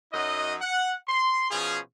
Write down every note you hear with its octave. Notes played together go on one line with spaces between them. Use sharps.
F#2 F#3 D#4 D#5
F#5
C6
B2 F3 C#4 F4 G#4